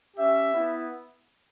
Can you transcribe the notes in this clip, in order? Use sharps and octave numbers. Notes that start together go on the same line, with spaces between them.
C#4 G4 E5
B3 E4